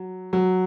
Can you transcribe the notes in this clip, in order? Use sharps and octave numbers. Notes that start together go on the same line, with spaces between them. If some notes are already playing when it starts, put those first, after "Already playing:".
Already playing: F#3
F#3